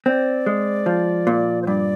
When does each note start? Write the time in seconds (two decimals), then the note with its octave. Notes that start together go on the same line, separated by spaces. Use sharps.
0.06 C4 D5
0.46 G#3
0.86 F3
1.27 A#2
1.62 C5
1.67 G2 D5